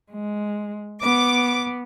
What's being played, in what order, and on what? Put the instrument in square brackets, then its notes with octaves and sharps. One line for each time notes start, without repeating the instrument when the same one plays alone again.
[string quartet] G#3
[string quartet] B3 [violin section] D6